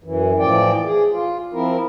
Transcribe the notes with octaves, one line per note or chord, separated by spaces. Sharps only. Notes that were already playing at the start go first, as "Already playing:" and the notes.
F#2 E3
A2 E3 F3 D5 G5
G#4
F4
F3 C4 E4 A#4